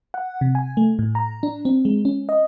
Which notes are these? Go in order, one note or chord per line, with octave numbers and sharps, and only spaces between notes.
F#5
C3
G#5
A3
A2
A#5
D4
C4
G#3
C#4
D#5